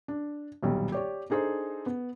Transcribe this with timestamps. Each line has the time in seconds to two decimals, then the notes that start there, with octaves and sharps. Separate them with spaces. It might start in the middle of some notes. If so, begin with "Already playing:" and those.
0.08 D4
0.63 D#1 B1 G3
0.92 G4 C#5 D5
1.30 D4 D#4 G#4 A4 C5
1.86 B3